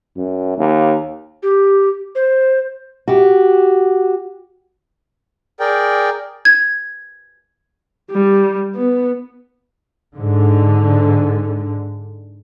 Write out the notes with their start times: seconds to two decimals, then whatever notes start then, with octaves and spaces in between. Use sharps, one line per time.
0.17 F#2
0.58 D#2
1.43 G4
2.15 C5
3.08 F#4 G4
5.60 G#4 A#4 D5 G5
6.45 G#6
8.11 G3
8.75 B3
10.16 G#2 D3